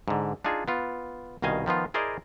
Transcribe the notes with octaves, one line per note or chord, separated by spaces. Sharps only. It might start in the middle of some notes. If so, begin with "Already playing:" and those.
G#2 D3
D4 D#4 F4 G#4
B3 F4
C2 B2 D#3 D#5 F5 G#5
D#3 F3 B3 F4
E4 G#4 A#4 C5 D5 D#5